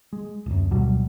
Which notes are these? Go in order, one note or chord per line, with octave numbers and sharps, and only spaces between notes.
G#3
D1 F#2
D2 B2 F#3 G3